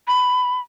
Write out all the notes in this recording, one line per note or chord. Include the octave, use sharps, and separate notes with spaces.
B5